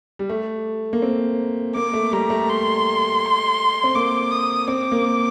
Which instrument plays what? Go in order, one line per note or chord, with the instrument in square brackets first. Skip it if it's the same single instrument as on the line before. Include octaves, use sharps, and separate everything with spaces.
[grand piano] G3
A3
A#3
C4
[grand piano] A#3 [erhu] D6
[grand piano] A3
[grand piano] G3 [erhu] A#5
[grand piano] A3
[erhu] C6
[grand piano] C4
[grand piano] A#3 [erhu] D6
[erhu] D#6
[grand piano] C4 [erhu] D6
[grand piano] A#3